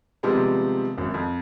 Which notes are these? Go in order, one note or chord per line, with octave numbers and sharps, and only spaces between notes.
C3 D#3 F3 G3 G#3 B3
G#1 F#2
F2